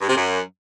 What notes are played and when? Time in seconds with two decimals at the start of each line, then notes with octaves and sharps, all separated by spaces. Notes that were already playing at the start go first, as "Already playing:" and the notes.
0.01 G2
0.08 C3
0.16 F#2